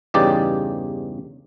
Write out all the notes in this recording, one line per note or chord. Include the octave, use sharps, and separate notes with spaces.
E2 G2 C#3 D#4 G4 D5